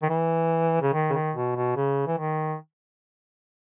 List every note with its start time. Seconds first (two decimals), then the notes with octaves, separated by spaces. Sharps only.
0.02 D#3
0.09 E3
0.82 C#3
0.93 D#3
1.10 C#3
1.13 D#3
1.35 B2
1.56 B2
1.76 C#3
2.07 E3
2.18 D#3